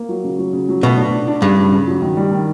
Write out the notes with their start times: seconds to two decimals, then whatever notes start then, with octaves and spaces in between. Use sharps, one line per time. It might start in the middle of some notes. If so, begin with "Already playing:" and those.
Already playing: A#3
0.09 F#3
0.24 C#3
0.39 F#3
0.53 C#3
0.69 F#3
0.83 B2 A3
0.97 D4
1.13 D4
1.27 D4
1.42 G2 C#3
1.58 C#3
1.72 C#3
1.87 F#3
2.02 D#3
2.17 G3
2.32 D#3